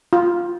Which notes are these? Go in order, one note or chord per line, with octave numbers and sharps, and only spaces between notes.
F4